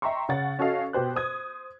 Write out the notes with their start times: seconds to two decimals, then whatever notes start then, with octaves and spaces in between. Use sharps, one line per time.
0.02 D#5 E5 G5 A#5 C6 C#6
0.29 C#3 C#5 F#5 A6
0.59 C#4 F#4 A4 D#5 F5
0.93 B2 G4 C5 F#6
1.16 C5 D#6 G#6